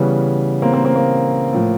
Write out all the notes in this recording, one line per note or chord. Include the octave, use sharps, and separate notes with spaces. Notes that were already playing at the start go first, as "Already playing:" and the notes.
Already playing: C#3 E3 G3 B3 C#4
A#3 C4
A#3 C4
A#3 C4
A#3
A2 F3